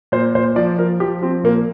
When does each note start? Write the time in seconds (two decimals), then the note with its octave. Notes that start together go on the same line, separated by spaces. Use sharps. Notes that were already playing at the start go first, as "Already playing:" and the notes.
0.12 A#2 C5
0.35 A#2 C5
0.56 F3 D5
0.78 F3 A#4
1.00 F3 G4
1.22 F3 C4
1.44 A#2 A#3